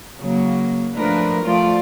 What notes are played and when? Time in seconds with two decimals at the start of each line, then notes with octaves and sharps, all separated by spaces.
0.19 C#3 F#3 A#3
0.96 F3 A3 D4 A#4 B4
1.43 F3 A3 F4 D5